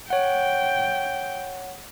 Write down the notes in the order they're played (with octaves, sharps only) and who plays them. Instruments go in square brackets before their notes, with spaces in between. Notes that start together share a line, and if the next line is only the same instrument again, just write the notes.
[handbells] C#5 F#5 [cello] G5